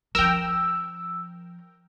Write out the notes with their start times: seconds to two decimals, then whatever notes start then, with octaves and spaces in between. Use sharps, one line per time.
0.15 F3 C#4 A#4 G5 E6